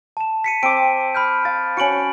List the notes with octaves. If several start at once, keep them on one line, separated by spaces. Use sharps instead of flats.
A5 E7
B6 C#7 D#7
C4 D6 D7
B5 F6 G6
F5 A6
C#4 F#4 C#7 D7 F#7